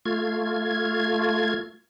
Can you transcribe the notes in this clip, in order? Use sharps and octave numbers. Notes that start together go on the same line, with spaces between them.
A3 F4 G#6